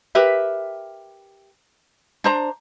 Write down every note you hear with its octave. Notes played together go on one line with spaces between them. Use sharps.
G4 A#4 B4 E5
D4 C5 A#5